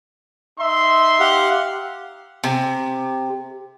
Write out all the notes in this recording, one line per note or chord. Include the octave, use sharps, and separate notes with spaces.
D#4 E5 C6
G4 F5 F#5
C3